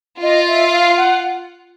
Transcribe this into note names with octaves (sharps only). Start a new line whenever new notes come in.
F4 D#5
E5
F5
F#5